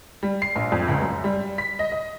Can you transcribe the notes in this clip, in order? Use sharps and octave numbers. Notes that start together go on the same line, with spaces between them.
G3
C7
A#1
F2
C#2
F#2
G3
B6
D#5
D#5